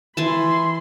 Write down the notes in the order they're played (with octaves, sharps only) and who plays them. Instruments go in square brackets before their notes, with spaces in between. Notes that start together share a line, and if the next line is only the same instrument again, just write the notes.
[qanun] E3 G#5 A5 [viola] B5 C6